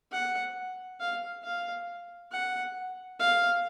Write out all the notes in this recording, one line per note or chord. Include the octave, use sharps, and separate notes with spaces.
F#5
F5
F5
F#5
F5